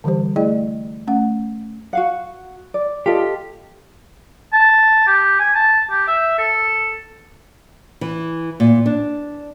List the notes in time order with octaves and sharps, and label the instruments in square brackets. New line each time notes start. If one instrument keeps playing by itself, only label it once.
[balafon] D3 E3 G3 G4 C5
A3 E4 G#4 D5 D#5 G5
A3 C#4 F#5
[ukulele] F#4 F5 F#5
D5
[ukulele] F4 A4 D#5 [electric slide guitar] G4
[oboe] A5
G4
G#5
A5
G4
E5
A4
[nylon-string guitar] E3
A#2
D4